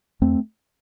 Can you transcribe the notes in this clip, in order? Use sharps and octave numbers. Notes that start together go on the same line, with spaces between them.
E2 A3 C4